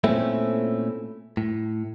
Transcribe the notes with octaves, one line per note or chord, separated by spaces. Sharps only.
A#2 A3 C4 C#4 E4
A2